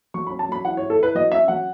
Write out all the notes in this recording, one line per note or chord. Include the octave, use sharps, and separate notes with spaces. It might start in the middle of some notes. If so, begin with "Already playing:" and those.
F#3 C#6
B5
C#4
A5
F#3 B5
E4 F#5
C#5
E4
A4
E4 B4
F#3 D#5
C#4 E5
F#3 F#5